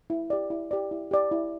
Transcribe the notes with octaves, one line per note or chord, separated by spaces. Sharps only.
E4
G4 D5
E4
G4 D5
E4
G4 D5
E4